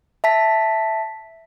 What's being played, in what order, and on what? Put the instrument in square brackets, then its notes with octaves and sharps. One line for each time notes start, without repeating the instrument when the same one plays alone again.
[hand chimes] E5 A5 B6